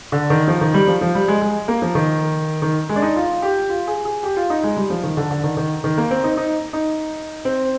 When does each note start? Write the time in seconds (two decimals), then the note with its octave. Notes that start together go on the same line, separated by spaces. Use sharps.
0.12 D3
0.30 D#3
0.48 F3
0.61 D#3
0.74 G3
0.88 F3
1.01 F3
1.15 G3
1.28 G#3
1.41 G#3
1.68 A#3
1.82 F3
1.95 D#3
2.62 D#3
2.89 G#3
2.96 D4
3.02 D#4
3.16 F4
3.42 G4
3.70 F4
3.87 G#4
4.05 G#4
4.23 G4
4.37 F4
4.50 D#4
4.63 G#3
4.77 G3
4.90 F3
5.03 D#3
5.17 D3
5.31 D3
5.44 D#3
5.57 D#3
5.84 D#3
5.98 A#3
6.11 C4
6.24 D#4
6.37 D#4
6.73 D#4
7.45 C4